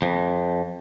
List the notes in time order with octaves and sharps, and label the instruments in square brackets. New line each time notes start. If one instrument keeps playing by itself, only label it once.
[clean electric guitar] F2